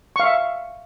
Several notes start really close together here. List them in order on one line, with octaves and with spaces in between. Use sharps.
C#6 F5 E5